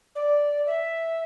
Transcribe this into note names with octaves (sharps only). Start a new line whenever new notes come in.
D5
E5